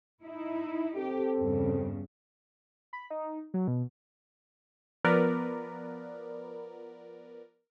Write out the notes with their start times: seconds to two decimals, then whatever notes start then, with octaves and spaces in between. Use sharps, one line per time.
0.23 D#4 E4
0.96 C4 G4 A4
1.38 E2 G2 C#3
2.93 B5
3.10 D#4
3.54 F#3
3.68 B2
5.04 F3 B3 A#4 B4 D5